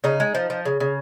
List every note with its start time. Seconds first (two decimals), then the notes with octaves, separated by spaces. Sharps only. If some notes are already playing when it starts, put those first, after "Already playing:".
0.04 C#3 D#4
0.20 G#3
0.35 F3
0.50 F3
0.65 C#3
0.80 C#3